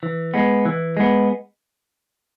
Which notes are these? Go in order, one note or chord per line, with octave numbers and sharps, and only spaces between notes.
E3
G#3 B3
E3
G#3 B3